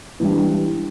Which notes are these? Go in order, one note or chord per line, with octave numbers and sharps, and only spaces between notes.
E3 G3 D4